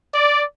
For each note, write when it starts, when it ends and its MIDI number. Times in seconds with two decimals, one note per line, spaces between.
0.14 0.43 74